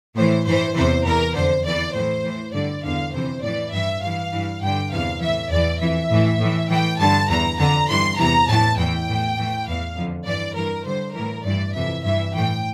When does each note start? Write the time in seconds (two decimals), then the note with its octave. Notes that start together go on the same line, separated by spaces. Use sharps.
0.16 A2 E3 C5
0.46 G2 E3 C5
0.75 E2 C3 E3 C5
1.05 E2 E3 A#4
1.34 F2 D3 C5
1.65 E2 E3 D5
1.94 A2 E3 C5
2.24 A2 E3
2.53 G2 D3 D5
2.83 E2 D3 F5
3.13 F2 C3 E3 C5
3.42 A2 E3 D5
3.72 G2 E3 E5
4.02 G2 E3 F5
4.32 G2 E3
4.62 G2 D3 G5
4.91 E2 C3 E3 F5
5.20 A2 E3 E5
5.50 E2 E3 D5
5.80 F2 E3 E5
6.11 A2 E3
6.40 A2 E3
6.69 A2 E3 G5
6.99 G2 D3 A5
7.29 E2 E3 A#5
7.58 F2 D3 A#5
7.89 G2 E3 C6
8.18 E2 C3 E3 A#5
8.48 A2 E3 A5
8.77 E2 E3 G5
9.08 A2 E3
9.36 A2 E3
9.67 E2 E3 F5
9.96 F2 D3
10.26 G2 E3 D5
10.55 G2 E3 A#4
10.85 G2 D3 C5
11.15 A2 E3 A#4
11.45 G2 E3 D5
11.74 F2 C3 E3 E5
12.04 G2 E3 E5
12.34 A2 E3 G5